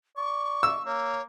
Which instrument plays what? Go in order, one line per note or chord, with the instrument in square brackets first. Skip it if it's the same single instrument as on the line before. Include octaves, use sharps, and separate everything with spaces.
[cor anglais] D5 [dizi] C#6
[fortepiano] E6
[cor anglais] A#3 [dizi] C#5